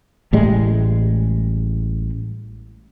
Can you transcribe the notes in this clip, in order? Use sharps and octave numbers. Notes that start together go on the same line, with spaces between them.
A1 A2 G3 G#3